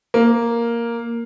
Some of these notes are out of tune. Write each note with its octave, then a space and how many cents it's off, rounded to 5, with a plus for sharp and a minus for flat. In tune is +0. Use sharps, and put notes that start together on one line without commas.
A#3 +0